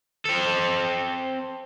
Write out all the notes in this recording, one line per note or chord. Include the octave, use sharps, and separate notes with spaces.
C4 A4